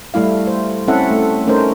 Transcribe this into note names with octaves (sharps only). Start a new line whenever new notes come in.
G3 A3 E4 F5
C5
C4 C#4 E4 A4 E5 F#5
A3
A3 C#4 D#4 A#4 C5